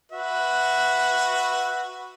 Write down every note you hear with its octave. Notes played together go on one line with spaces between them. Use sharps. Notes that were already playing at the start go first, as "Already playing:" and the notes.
F#4 B4 E5